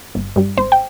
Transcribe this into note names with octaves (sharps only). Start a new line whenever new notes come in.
G1
G2 G3
G#1 C5
G5